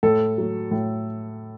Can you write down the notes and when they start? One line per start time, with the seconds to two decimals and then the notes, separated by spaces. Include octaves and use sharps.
0.03 A2 A4
0.38 F#3 A3
0.71 A2